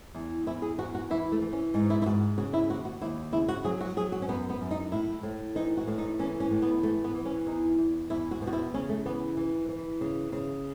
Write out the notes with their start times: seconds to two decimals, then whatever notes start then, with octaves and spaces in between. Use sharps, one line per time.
0.15 E2
0.46 E2 E4
0.62 G#4
0.78 E2 F#4
0.95 F#4
1.10 E3 E4
1.32 A3
1.42 E3
1.53 C#4
1.74 G#2 D#4
1.90 E4
2.02 E4
2.06 G#2 F#4
2.38 C#3 F#4
2.53 E4
2.70 D#2 F#4
2.85 F#4
3.01 D#2 E4
3.33 C#3 E4
3.48 F#4
3.64 F#3 G#4
3.81 F#4
3.96 F#3 G#4
4.12 F#4
4.22 C#4
4.28 F#2 B3
4.50 B3
4.61 F#2
4.71 D#4
4.92 A2 E4
5.23 A2
5.55 E3 D#4
5.77 F#4
5.87 A2
5.98 D#4
6.19 E3 C#4
6.40 C#4
6.51 A2
6.62 B3
6.83 E3 A3
7.04 B3
7.14 E3
7.25 C#4
7.47 E2 D#4
7.78 E2
8.10 E2 E4
8.31 F#4
8.42 B2
8.47 F#4
8.53 E4
8.74 C#3 C#4
8.89 A3
9.05 E3 B3
9.37 E3
9.69 E3
10.01 C#3
10.32 C#3